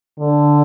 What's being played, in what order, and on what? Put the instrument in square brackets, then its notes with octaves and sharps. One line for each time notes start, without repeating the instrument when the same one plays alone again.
[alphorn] D3